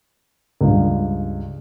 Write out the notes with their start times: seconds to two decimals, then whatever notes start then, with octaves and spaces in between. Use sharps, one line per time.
0.61 C#2 G2